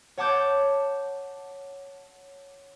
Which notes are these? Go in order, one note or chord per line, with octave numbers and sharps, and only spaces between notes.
C#5 F#5 A5 D6 G6